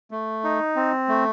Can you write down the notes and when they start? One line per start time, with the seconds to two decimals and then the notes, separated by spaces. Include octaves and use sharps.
0.11 A3
0.44 D#4
0.76 C4
1.08 A3